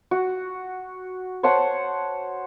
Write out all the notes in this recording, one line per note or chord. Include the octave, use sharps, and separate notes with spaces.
F#4
C5 C#5 F#5 A5